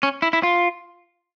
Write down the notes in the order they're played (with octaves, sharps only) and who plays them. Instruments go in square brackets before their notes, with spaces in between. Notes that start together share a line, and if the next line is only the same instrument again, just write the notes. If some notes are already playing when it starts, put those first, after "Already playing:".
[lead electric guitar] C#4
E4
E4
F4